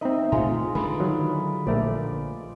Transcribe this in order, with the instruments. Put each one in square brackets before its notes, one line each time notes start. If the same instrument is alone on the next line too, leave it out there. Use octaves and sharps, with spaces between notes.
[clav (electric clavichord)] C4 D#5 [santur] D#4 E5
[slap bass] A#2 A3 [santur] G#3 F4 [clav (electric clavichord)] A#5
[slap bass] D3 G#3 D4 [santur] B4
[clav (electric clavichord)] D#3 F#3
[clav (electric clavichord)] A#1 A3 A#4 [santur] D5